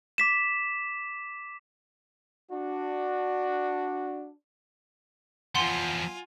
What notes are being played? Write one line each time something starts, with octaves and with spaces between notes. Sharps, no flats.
D6 B6 E7
D4 F#4
E2 F3 F4 F#5 G#5 C6